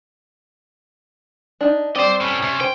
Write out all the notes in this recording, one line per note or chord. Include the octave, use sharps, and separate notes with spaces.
D4 D#4
G3 C4 C5 D5 D#5
A2 C#4
C3
C5 G5